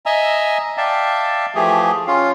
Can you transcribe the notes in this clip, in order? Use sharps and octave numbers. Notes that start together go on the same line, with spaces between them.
D#5 E5 G#5 A#5 E6
D5 E5 F5 G5 A5
E3 F3 A3 G4 G#4
C#4 F4 F5